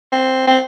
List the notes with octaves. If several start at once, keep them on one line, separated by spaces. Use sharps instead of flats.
C4
C4